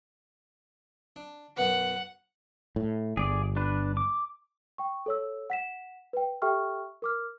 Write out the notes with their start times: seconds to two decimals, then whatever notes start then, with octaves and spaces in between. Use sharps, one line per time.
1.16 D4
1.57 F#2 B2 B4 F#5
2.76 A2
3.17 G1 G#4 D5
3.57 D4 B4
3.97 D6
4.78 G5 C#6
5.06 A4 C#5 E6
5.50 F#5 B6 E7
6.13 B4 G5
6.42 G4 A4 E5 G5 C#6 F6
7.02 A#4 D6 F6